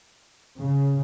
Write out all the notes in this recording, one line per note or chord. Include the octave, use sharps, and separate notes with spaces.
C#3